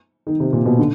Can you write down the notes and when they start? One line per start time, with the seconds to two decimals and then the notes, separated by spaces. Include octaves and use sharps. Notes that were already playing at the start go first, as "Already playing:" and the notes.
0.27 D#3
0.40 C3
0.53 A#2
0.66 B2
0.79 D3